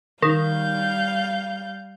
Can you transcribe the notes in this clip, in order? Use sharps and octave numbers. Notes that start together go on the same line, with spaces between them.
D#3 G3 F5 G6